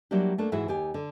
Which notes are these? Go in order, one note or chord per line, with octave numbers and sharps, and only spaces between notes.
F#3 G3 A#3 D4 E4 G4
A3 A#3 D4
G#2 E3 E4 F#4 G#4
D#2 G4 G#5
D3